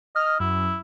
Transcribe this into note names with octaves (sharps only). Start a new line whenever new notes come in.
D#5 F6
F#2 E4